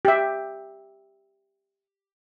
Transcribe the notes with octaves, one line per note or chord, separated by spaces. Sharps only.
G4 E5